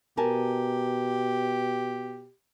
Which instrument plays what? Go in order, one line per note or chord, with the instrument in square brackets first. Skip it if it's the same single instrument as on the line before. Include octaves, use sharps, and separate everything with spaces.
[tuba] B2 [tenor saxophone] G4 [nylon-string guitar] A#4 G#5 A5